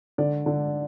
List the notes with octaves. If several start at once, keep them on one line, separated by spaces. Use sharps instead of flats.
D3 D5
D3